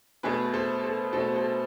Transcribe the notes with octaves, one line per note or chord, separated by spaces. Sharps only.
B2 A3 G#4 B4
A4 C5
A4 C5
B2 A3 A4 C5
A4 C5